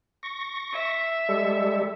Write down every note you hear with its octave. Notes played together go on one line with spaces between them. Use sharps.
C#6 A#6
E5
G3 G#3 A4